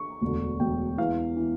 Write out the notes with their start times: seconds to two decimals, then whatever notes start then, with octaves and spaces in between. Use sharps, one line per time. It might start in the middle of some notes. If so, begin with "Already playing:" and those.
Already playing: C#6
0.22 E1 D2 D3
0.60 E1 D2 D3 G5
0.98 E2 E3 F5
1.37 E3